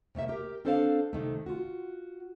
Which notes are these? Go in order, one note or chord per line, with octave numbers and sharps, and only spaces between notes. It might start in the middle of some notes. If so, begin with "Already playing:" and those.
C3 A3 A#3 E5
G4 A#4
C4 D4 A4 C5 D5 F5
C3 D#3 A3
F4 F#4